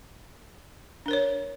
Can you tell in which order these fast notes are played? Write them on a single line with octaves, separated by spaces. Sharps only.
D4 A#4 C5 C#5